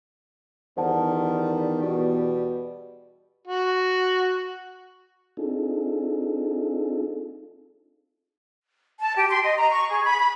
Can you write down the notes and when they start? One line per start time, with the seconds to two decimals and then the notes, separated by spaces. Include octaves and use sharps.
0.77 E2 D#3 G3 C5 F#5 A5
1.82 B2
3.47 F#4
5.37 C4 D4 D#4 F4 G#4 A4
9.00 A5
9.16 G4
9.30 C6
9.42 D#5
9.57 A#5
9.70 C#6
9.89 G#4
10.04 B5
10.18 B5